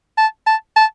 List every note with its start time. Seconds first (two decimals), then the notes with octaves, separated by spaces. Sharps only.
0.18 A5
0.46 A5
0.76 A5